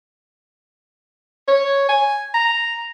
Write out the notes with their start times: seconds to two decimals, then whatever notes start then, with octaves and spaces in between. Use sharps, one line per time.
1.48 C#5
1.89 G#5
2.34 A#5